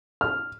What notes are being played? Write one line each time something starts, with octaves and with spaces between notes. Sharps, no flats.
F6